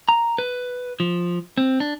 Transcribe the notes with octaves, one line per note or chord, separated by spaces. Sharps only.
A#5
B4
F3
C4
D4